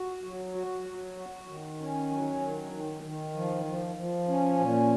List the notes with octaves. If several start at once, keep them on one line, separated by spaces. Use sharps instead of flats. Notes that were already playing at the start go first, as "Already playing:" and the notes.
Already playing: F#4
F#3
F#4
F#3
F#4
D#3
C#4
F#3
D#3
D#3
D#3
F3
F3
F3
C#4
A#2